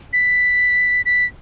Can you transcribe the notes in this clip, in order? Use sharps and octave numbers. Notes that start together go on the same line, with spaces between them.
B6
B6